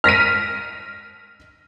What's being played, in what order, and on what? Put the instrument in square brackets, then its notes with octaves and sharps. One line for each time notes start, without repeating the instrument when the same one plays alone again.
[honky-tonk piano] F6 A#6 B6 D#7